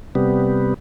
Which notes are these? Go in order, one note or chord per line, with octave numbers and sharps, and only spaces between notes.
C3 G3 B3